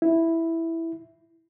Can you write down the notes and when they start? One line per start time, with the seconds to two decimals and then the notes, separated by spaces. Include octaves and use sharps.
0.02 E4